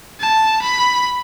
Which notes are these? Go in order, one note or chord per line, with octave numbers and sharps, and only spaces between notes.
A5
B5